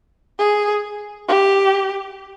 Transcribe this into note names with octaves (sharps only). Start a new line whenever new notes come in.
G#4
G4